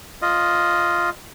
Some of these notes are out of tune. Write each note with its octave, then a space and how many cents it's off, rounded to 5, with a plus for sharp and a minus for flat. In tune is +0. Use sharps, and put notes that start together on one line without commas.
F4 +0 D#5 +0